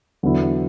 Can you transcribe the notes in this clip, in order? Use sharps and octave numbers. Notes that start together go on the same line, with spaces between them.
E2 D3 F#3 B3 E4